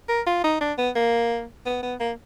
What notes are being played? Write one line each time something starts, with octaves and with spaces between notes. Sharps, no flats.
A#4
F4
D#4
D4
B3
A#3
B3
B3
A#3